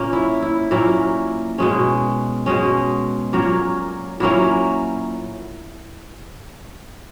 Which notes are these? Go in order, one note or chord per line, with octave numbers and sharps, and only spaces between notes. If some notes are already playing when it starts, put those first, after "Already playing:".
Already playing: A#2 A#3 C#4
E4
E4
A#2 F#3 A#3 C#4 E4
B2 G#3 C#4
B2 G#3 C#4
A#2 F#3 A#3 C#4
A#2 F#3 A#3 C#4 E4